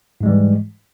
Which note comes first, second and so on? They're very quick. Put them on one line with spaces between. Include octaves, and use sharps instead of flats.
G#2 G#3 G3 E3